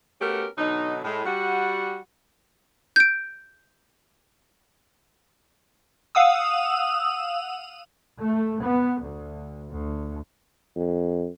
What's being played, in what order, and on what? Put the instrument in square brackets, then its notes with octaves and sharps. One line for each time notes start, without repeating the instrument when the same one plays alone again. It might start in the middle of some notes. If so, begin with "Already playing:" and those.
[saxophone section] A3 B3 C#4 F#4 G4 A#4
B2 D3 F#3 D#4
A2 G#3
G3 F#4 F#5
[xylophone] G6 D7
[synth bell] F5 F#5 D#6 E6
[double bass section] A3
B3
D2
D2
[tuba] F2